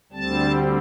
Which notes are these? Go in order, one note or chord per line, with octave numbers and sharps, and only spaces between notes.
D2 D3 G3 C4 A5